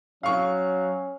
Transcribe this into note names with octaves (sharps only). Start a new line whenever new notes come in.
F#3 C#4 F5 C#6